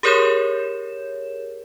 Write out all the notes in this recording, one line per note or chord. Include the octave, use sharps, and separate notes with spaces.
G4 G#4 A#4 C#5 G6 E7